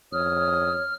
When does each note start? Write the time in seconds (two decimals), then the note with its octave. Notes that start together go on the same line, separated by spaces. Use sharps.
0.13 F2 C#5 D#6 F6